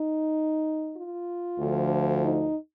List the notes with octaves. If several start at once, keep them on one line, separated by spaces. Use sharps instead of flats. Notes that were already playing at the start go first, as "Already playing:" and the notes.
Already playing: D#4
F4
D2 D3 F3
D#4